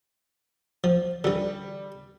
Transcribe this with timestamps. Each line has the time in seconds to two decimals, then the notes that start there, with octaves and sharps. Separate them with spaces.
0.84 F3
1.24 D3 E3 G3